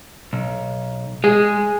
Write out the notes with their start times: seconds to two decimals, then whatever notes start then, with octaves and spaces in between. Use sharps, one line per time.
0.33 B1
1.24 G#3 G#4